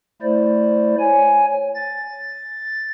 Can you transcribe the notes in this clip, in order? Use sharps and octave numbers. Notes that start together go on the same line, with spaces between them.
A3 E4 C5 D5
C#5 G#5
A6